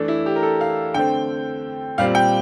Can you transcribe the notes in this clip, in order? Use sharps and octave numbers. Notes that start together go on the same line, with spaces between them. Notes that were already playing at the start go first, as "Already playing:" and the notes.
Already playing: E3 A3 D4
E4
G4
A#4
A4
F5
D3 A3 C4 G5
A#2 G3 C4 F5
G5